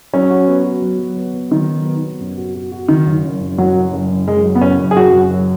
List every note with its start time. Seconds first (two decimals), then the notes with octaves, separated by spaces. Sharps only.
0.13 F#3 C#4
0.30 F#4
0.47 B3
0.64 F#4
0.82 F#3
0.99 F#3
1.17 B3
1.34 B3
1.51 D#3 F#3
1.68 F#3
1.85 B3
2.03 B3
2.20 F#2
2.37 F#4
2.55 F#4
2.72 F#4
2.89 F#1 D#3
3.06 F#1
3.24 F#2
3.41 F#2
3.58 F#1 F#3
3.75 F#2
3.93 F#1
4.10 F#2
4.27 F#2 G#3
4.44 F#3
4.55 B3
4.61 F#1 C#4
4.79 F#2
4.91 G#4
4.96 F#2 F#4
5.13 F#2
5.31 F#3